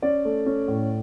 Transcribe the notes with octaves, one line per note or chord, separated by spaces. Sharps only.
C#4 D5
A3
C#4
A2